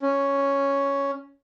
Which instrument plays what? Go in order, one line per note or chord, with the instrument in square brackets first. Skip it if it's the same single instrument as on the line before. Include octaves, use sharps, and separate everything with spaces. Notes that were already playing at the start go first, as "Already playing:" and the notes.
[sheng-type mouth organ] C#4